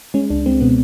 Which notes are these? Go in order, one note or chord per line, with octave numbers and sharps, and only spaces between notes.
G#3 C#4
C#2 D4
G#3 C4
B2 B3